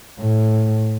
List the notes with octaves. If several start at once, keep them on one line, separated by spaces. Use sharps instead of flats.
A2